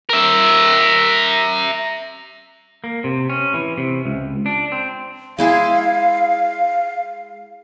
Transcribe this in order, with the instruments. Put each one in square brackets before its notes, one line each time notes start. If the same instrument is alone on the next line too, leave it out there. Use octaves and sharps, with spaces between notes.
[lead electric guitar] A#4 E5
[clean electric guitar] A#3
C3
C#4
E3
C3
C#2
D4
C4
[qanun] G#3 E4 G#4 [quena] F5